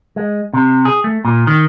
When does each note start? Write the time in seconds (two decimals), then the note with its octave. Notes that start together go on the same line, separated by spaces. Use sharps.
0.16 G#3
0.53 C3
0.85 G#4
1.04 A3
1.25 A#2
1.47 D#3